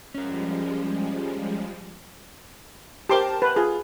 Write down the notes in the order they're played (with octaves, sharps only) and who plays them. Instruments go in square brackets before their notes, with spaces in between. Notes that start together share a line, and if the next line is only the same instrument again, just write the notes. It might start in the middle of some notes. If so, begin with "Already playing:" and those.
[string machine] F3 G3 G#3 [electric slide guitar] C#4 A#4
[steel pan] G4 C6 D6 [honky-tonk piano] A#4 C5 A5
[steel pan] B4
[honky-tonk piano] F4 [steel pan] G#4